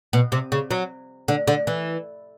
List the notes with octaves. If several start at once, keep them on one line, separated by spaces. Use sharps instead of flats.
B2
C3
C#3
F#3
D3
D3
E3